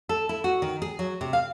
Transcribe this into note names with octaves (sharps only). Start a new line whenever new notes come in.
A4
E4
F#4
D#3
G#4
F#3
C3
F5